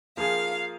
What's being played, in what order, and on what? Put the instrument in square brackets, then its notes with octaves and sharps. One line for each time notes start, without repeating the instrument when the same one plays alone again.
[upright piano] F3 A#3 F4 G#4 [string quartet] F5